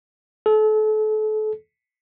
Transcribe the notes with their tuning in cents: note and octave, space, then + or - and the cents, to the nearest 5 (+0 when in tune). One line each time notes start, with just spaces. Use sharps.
A4 -35